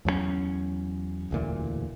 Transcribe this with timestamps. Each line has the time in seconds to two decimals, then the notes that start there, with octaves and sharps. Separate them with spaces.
0.05 E2 F#3 G3 C#4
1.31 E1 D2 A#2 E3